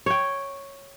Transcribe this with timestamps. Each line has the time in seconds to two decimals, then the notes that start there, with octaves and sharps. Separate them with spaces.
0.06 C#5 G5